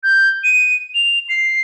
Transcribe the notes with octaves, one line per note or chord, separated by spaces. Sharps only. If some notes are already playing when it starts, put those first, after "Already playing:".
G6
D#7
F7
C7